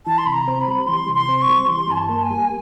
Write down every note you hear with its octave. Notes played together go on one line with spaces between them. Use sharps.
E3 A5
C6
C3 B5
A#5
C4
B5
G3
E3 C6
C3
C6
C4
C#6
G3
E3 C6
G2 G#5
A5
A#3
G#5
G3